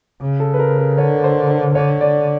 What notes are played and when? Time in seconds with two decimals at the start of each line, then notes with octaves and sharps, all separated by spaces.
0.21 C#3
0.40 A4
0.54 B4
0.59 A#4
0.78 B4
0.98 D3 C#5
1.24 C5
1.48 C5
1.75 D3 C#5
2.01 D5